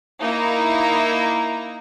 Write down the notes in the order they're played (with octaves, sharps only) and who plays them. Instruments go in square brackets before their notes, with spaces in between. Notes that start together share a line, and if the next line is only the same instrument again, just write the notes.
[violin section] A#3 D#4 E4 A#5